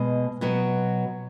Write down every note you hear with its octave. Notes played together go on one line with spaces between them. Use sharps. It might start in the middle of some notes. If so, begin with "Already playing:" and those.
Already playing: B2 G#3
B2 F#3 B3